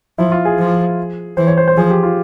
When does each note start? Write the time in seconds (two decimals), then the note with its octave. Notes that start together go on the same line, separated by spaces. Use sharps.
0.18 F3 E4
0.32 F4
0.45 G#4
0.59 F3
1.37 E3 C5
1.47 C#5
1.57 C5
1.68 C5
1.77 F3 G#4
1.90 G4
2.03 F4